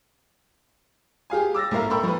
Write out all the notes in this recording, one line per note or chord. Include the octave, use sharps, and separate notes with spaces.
G4 G#4 F5 G#5
D6 E6 A6 A#6
A#1 A2 A#4 E5 F5 A#5
A4 A#4 G5 B5 C#6 E6
F3 B4